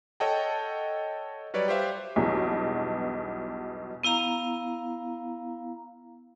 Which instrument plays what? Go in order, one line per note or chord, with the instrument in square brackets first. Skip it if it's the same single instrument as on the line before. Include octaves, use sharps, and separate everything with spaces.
[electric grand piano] A4 C#5 D#5 F#5 G5 A5
F#3 G3 B4 C#5 D5
G4 B4 C5 E5 F5
[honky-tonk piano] B1 E2 G2 B2
[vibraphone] B3 E4 F5 A#5